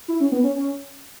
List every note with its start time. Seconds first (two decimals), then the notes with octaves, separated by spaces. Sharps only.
0.08 E4
0.20 C#4
0.32 B3
0.44 C#4
0.56 C#4